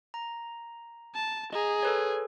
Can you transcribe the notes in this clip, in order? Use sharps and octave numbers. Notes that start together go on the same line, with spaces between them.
A#5
A5
G#4 D#5 A#5
A4 B4 C#5